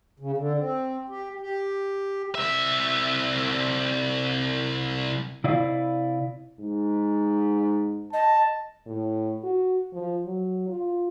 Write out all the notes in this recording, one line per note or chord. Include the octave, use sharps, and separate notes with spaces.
C#3
D3
C4
G4
G4
C2 E5
C3 E4 D5 D#5 F5
G#2
D#5 A5
A2
F#4
F3
F#3
F4